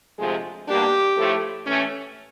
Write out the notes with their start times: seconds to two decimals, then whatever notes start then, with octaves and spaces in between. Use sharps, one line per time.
0.19 D2 C3 F3 G#3
0.68 B2 G3 A#3 D4 G4
1.17 A2 F3 A3
1.66 A2 E3 A3 C#4